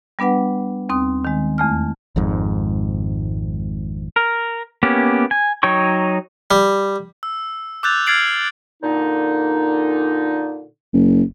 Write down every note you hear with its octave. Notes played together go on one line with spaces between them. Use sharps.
G3 B3 D4 B4 F#5
D#2 C4 D#6
D#3 G#3
E2 A3 F6
G#1 F2 G#2
A#4
A#3 B3 C#4 G4
G#5
F#3 D#4 C#5 G5 C#6
G3
E6
D6 E6 F#6 G6 A6 F7
F6 G#6 A6 C7 D7 F#7
A#2 D3 D#4
F#1